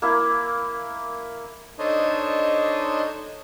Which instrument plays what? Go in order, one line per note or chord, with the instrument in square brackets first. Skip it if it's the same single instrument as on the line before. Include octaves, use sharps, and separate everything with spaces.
[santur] A#3 E4
[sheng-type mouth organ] D4 D#4 A4 C5 C#5 D#5